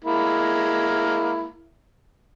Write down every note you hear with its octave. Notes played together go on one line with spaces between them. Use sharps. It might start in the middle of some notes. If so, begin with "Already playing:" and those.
G#3 A#3 E4